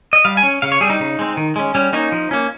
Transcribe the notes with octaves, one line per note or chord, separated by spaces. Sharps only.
D#5
G3 F5
G#5
C#4
C#3 F5
C#5
G3 C4 G#4
D#4
C#3
G#3 C4
D#3
G#3 C#4
G3 C#4
A#3 C#4 D#4
F3
A#3 C#4